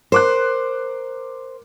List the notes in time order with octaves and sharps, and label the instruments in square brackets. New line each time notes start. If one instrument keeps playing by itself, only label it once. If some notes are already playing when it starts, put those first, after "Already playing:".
[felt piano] A#4 D6 F#6 [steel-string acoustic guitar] C5